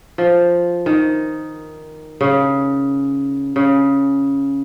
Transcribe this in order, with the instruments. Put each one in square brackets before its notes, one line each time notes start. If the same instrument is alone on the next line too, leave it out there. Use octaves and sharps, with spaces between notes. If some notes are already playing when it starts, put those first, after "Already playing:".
[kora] F3
D#3
C#3
C#3